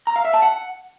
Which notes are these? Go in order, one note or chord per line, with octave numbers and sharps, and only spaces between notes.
A#5
F5
E5
A5
F#5